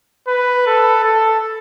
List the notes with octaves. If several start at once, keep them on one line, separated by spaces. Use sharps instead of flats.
B4
A4
A4